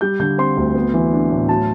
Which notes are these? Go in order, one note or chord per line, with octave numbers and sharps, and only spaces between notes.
G3 G6
D3 G6
C4 C6
D2
B3
E3
D4
A2
F#3 A5